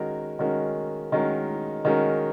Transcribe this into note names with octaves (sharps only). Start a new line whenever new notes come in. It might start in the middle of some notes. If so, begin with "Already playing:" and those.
Already playing: D#3 G#3 C#4 F#4 A#4
D#3 G#3 C#4 F#4 A#4
D#3 G#3 C#4 F#4 A#4
D#3 G#3 C#4 F#4 A#4